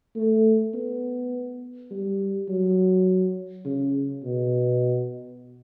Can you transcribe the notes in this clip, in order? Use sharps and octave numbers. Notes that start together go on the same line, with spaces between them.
A3
B3
G3
F#3
C#3
B2